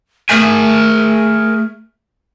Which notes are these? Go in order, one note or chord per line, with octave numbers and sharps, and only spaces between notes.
A3 G#4 A#4 G#5